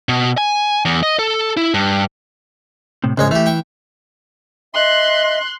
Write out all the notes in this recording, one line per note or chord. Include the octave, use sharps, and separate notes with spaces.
B2
G#5
E2
D#5
A4
E4
G2
A2 C3
A#1 G#2 C#3 G#3 C#5
E3 A3 G4
G5 C#6
D#5 E5 C6 F#6